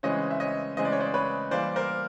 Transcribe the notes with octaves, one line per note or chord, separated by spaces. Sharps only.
C#3 E3 G#3 C4 C#5 D#5
E5
C#5 D#5
C#3 E3 G#3 C4 D#5
D5
C#5
C5 D5
B4 C#5
E3 G3 A#3 C5 D5
A#4 C5